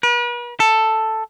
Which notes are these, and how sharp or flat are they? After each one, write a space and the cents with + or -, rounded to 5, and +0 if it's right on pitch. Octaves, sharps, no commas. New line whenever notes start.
B4 -40
A4 +5